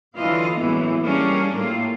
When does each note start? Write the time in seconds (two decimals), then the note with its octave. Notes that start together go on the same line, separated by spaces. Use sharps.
0.16 D3 E3 F#3 F4 D#5 F5
0.59 F#2 A2 E3 G#3 A#3 B3
1.04 G3 A#3 C#4 D4 G#4 A#4
1.55 A2 G3 A#3 F4